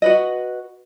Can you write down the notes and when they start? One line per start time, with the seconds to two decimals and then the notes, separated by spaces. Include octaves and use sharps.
0.02 F#4 B4 D#5